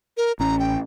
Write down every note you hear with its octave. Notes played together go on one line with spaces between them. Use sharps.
A#4
A1 C#4 A#5
G5